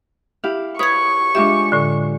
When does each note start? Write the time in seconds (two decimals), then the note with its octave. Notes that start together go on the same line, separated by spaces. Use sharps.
0.44 E4 G4 F5
0.79 B4 C#5 C#6 D#6 G#6
1.35 G#3 D4 F4 G4 E5
1.72 A2 D3